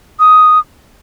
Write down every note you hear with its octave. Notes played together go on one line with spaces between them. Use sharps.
D#6